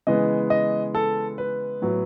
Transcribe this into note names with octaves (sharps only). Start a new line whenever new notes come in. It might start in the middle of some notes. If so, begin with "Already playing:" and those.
C#3 E3 G#3 B3 D#5
D#5
A4
B4
A2 F#3 B3 E4